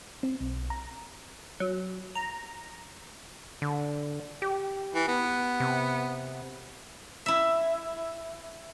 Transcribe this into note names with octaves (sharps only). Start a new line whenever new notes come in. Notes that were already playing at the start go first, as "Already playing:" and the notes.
C4
B1
A#5
F#3
A#5
D3
G4
E3
B3
C3
E4 E5